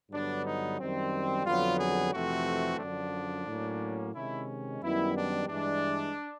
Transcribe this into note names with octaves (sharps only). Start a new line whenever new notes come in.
G2 D3 F#3 B3 D4
D#4
F#2 D#3 G3 C4
F2 D3 F#3 B3 F4
G#4
F2 C3 E3 A3 C4 F#4
F#2 D3 F3 D4
A2 F#3 A#3 C#4
C3 D#3 G#3 C#4 E4
F#2 D#3 G3 B3 E4
D4
G2 E3 G#3 D4